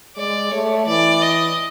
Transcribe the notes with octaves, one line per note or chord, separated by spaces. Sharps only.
G#3 D5
A3 C#5
E3 D5
D#5